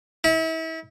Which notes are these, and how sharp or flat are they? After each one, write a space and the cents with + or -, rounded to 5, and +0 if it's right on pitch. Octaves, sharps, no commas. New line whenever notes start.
E4 -35